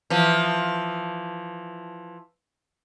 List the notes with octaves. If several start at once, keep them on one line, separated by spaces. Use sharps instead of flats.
E3 F3